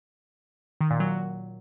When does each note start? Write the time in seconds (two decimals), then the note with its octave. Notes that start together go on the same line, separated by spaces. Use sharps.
0.81 D#3
0.90 A#2
1.00 F#3